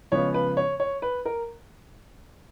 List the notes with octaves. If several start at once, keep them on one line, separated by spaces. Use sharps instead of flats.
C#3 F3 G#3 B3 C#5
B4
C#5
C#5
B4
A#4